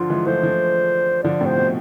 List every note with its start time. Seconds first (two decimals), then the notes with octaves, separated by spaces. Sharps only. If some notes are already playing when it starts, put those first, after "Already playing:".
Already playing: D3 F3 F4
0.10 E3 G#3
0.26 F3 A3 C5
0.42 F3 A3
1.23 D3 F3 D5
1.41 A2 C3
1.46 C5
1.57 B2